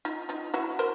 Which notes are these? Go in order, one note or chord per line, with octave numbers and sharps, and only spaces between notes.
D#4 F4
D#4 F4
E4 F#4
A#4 C5